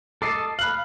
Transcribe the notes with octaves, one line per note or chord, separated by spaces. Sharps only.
A4 D#5 A5 D6 C7
F5 B5 F#6 F#7